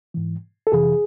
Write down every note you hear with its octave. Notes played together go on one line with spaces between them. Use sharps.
G#2 E3
A4
F2 C3 E3 G#4